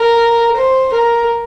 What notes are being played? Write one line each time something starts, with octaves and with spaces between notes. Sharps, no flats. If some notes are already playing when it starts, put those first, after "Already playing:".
Already playing: A#4
C5
A#4